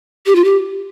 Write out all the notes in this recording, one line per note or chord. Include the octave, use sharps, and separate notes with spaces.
G4
F4
G4